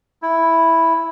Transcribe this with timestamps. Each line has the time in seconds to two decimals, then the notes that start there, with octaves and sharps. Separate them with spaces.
0.22 E4